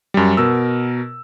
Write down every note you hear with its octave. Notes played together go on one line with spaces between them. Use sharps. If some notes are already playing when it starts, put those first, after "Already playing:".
F#2 G3
B2 A#4 E6